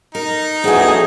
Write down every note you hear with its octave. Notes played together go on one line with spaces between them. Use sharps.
D#4 A#4
A#1 E3 C4 F#4 G#4 A4